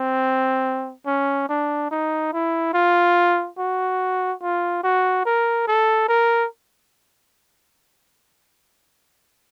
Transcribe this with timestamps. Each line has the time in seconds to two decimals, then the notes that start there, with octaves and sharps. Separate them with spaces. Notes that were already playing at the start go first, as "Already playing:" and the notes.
Already playing: C4
1.06 C#4
1.49 D4
1.91 D#4
2.33 E4
2.74 F4
3.58 F#4
4.42 F4
4.84 F#4
5.25 A#4
5.67 A4
6.08 A#4